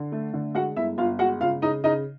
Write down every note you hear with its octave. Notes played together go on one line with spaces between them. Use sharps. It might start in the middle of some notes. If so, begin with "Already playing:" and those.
Already playing: D3
A3
D3
G#3 F#4 F#5
G1 E4 E5
G1 F4 F5
G#3 F#4 F#5
C#3 F4 F5
C#3 D#4 D#5
C#3 D#4 D#5